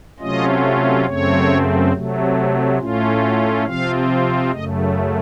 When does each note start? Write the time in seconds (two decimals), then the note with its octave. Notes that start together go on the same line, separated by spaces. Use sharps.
0.19 C3 F#3 A3 C#4 F4 D#5
1.06 F#2 C#3 A3 C4 C#5
1.92 C3 F#3 A3
2.78 A2 A3 C#4 F4
3.22 F#4
3.65 C3 F3 C4 F4 F5
4.51 F#2 C#3 A3 D#5